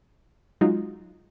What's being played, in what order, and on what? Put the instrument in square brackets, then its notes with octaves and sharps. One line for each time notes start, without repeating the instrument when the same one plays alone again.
[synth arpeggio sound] F#3 G#3 D#4 F4 F#4